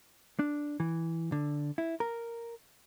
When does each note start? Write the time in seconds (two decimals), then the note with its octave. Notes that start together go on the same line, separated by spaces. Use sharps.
0.39 D4
0.80 E3
1.32 D3
1.78 E4
2.00 A#4